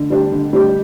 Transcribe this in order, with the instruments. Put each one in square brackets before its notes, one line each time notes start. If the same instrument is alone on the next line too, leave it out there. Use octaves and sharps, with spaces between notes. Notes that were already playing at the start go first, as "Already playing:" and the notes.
Already playing: [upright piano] D3 D4
G3 D4 G4
D3
G3 D4 G4